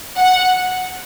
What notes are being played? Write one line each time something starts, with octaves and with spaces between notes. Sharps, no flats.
F#5